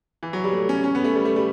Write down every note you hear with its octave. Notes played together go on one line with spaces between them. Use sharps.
E3
F#3
G3
A3
C#4
C#4
B3
A3
G3
A3
G3